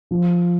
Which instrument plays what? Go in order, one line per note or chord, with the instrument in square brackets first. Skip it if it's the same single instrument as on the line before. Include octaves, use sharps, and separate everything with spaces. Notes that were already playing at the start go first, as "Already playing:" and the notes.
[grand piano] F3